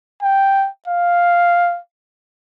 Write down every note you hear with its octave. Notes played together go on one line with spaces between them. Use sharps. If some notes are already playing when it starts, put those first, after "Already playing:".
G5
F5